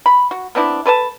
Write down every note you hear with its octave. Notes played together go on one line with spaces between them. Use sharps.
B5
F#4
B3 C4 D4 E4
A4 B4 C#5 A5